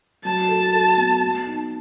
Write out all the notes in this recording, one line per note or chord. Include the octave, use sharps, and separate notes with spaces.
F#3 A5
A4
A4
B3
B3
D#4